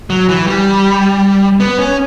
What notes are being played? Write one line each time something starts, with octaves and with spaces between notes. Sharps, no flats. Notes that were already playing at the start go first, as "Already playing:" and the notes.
F#3
E3
G3
B3
C#4